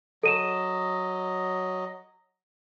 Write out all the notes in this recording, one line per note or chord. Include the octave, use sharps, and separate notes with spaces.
F#3 A4 D#5 D#7 E7